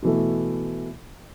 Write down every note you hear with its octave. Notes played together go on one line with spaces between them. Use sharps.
B2 E3 A3